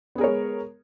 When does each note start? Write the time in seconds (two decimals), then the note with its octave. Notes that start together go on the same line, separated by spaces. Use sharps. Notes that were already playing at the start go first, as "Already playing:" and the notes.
0.15 B3
0.18 G#4
0.21 A#4
0.24 C#5
0.26 G#3